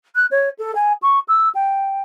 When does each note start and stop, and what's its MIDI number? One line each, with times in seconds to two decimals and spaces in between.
0.15 0.25 90
0.30 0.49 73
0.58 0.74 69
0.75 0.92 80
1.02 1.19 85
1.28 1.49 88
1.54 2.02 79